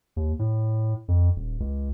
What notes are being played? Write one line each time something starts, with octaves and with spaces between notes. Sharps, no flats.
D#2
A2
F2
D#1
C#2